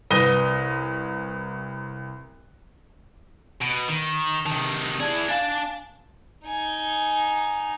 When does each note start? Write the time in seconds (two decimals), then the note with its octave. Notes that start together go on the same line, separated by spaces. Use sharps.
0.10 C2 B4 D#6 A#6 D#7 G7
3.62 B2 D7 D#7
3.88 D#3
4.46 C3 D#3 A5
5.00 E3 G#4 D5 A5 G#6
5.29 D4 F5 G#5 A5 A6
6.45 D#4 G#5